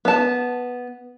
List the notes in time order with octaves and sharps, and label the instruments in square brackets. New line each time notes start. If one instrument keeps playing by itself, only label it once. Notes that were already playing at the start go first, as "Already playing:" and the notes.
[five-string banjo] B3 A5